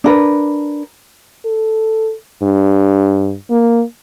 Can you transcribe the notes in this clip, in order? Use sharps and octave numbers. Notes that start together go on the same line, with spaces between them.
D4 A#4 B4
A4
G2
A#3